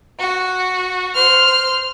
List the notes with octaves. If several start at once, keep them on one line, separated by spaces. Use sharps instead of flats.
F#4
C5 F6